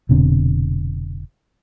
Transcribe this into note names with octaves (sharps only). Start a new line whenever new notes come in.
F1 B2 D3 C4